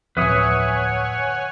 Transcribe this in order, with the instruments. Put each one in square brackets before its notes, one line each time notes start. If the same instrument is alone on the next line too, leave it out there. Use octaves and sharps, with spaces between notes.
[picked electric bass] D1 F2 [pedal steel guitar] B4 E5 D#6 [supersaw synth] C#5 G#5 [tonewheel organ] F#5